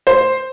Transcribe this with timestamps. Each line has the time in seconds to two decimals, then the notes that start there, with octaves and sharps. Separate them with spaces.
0.07 C5